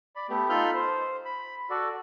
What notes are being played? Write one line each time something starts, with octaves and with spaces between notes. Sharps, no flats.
D5 B5
A3 B3 G4
D#4 F4 A4 B5 F6 G6
C5
B5
F#4 A4 D5